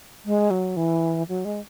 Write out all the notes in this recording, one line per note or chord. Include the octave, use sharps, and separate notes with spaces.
G#3
F#3
E3
F#3
G#3